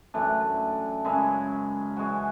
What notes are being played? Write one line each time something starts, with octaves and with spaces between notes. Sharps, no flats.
F#2 E3 A3 D4
F#2 C#3 G#3 C#4
E3 G#3 C#4 F#4